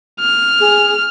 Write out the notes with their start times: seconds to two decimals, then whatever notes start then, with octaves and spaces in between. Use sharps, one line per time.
0.20 F6
0.60 G#4